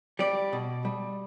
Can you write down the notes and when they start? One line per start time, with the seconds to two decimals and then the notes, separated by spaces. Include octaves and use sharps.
0.19 G3 D5
0.53 B2
0.85 G3